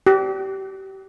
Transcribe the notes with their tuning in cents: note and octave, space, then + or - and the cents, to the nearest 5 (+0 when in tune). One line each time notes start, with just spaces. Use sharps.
G4 -30